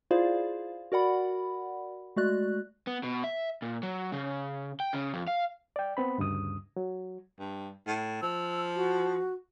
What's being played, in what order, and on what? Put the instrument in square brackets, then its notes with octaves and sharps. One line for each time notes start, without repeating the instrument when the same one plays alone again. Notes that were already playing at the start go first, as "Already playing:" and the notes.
[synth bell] E4 F4 G#4 C5 D5 F5
F#4 A#4 D5 F#5 B5
G#3 A3 F#4 D5 F#6
[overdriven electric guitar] B3
B2
E5
A#2
F#3
C#3
G5
C#3
F2
F5
[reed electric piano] D5 G5
B3 C4 B5
D2 G2 C#3 D#6
F#3
[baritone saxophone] G2
A2
[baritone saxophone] F3 [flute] E6
[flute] F#4